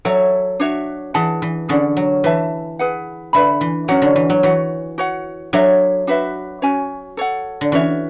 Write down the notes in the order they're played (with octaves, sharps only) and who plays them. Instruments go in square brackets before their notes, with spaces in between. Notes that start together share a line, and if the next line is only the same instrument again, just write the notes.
[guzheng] F#3 [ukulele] A4 C#5 E5
[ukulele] D4 F#4 C#5 E5
[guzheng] E3 [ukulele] G#4 D5 F#5 A5
[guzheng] E3
[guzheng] D3 [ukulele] C#4 G#4 D5 F#5
[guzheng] F#3
[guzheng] E3 [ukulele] B4 E5 A5
[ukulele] G#4 B4 F#5
[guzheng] D3 [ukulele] B4 E5 B5
[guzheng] E3
[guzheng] F#3 [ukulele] C#4 F#4 C#5 F#5
[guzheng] D3
E3
F#3
[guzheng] E3 [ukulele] F#4 C#5 F#5
[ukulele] F#4 C#5 F#5
[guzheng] F#3 [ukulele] D4 A4 C#5 E5
[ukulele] D4 F#4 B4 E5
C#4 F#4 C#5 G#5
A4 C#5 F#5
[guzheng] D3
[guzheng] E3 [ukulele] C#4 F#4 C#5 E5